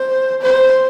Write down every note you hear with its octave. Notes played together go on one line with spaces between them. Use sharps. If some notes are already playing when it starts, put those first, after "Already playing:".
Already playing: C5
C5